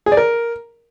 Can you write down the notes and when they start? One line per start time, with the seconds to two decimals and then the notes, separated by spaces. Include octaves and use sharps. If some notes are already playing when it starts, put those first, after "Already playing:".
0.06 G#4
0.12 D5
0.17 A#4